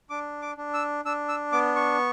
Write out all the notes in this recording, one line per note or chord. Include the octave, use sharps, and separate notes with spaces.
D4 D6
D6
D4
E6
D4 E6
E6
B3 D6
C#6